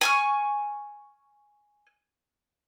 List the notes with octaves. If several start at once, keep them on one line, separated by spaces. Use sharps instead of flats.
G#5 C#6 F6